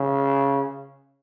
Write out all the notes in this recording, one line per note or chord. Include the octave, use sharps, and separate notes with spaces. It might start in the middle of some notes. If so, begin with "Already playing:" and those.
Already playing: C#3